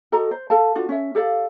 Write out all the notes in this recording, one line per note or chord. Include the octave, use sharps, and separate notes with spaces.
F#4 A4 D#5 A#5
C5
A4 F5 A5
D4 F4 F#4
C#4 E5
G4 A4 D5 F5